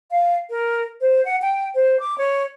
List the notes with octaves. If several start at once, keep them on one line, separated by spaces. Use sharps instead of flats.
F5
A#4
C5
F#5
G5
C5
D6
C#5